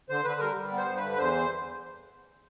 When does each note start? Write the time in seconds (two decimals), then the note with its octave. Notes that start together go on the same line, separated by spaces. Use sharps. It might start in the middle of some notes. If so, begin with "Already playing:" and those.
0.10 D3 C5
0.25 D3 B4
0.40 G3 A#4
0.56 G3
0.72 B3
0.77 C5
0.88 G2
0.97 B4
1.02 D3
1.18 E2 C5